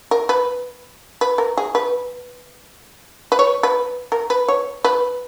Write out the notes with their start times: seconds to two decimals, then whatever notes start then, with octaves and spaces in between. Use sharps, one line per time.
0.11 A#4
0.29 B4
1.21 B4
1.38 A#4
1.57 G#4
1.75 B4
3.32 B4
3.39 C#5
3.63 B4
4.12 A#4
4.30 B4
4.48 C#5
4.84 B4